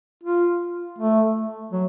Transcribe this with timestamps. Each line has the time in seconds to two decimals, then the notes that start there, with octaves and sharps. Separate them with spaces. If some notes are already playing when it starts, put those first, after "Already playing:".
0.23 F4
0.98 A3
1.72 F#3